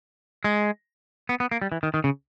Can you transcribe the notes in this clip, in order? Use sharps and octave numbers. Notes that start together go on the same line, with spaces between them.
G#3
B3
B3
A#3
G3
E3
D#3
D#3
C#3